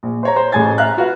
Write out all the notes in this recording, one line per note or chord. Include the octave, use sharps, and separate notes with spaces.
A#1
C5 C#5 A#5
C5
A1 A2 G#4 G#5 G#6 A6
E5 F5 A#5 F6 F#6
F4 F#4 B4 F5